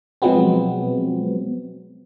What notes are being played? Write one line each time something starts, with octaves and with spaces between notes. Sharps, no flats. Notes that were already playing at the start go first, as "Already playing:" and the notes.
B2 F3 F#3 G#3 B3 C4